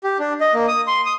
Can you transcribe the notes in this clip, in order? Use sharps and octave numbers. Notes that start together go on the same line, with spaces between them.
G4
D4
D#5
A#3
D#6
C6
D#6